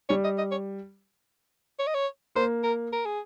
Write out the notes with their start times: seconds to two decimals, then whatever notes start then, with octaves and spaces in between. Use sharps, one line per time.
0.09 G3 C#5
0.24 D#5
0.38 D#5
0.51 C#5
1.79 C#5
1.87 D#5
1.95 C#5
2.35 A#3 C5
2.64 A#4
2.93 A#4
3.06 G#4